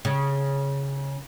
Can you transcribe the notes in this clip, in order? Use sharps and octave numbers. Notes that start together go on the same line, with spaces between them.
C#3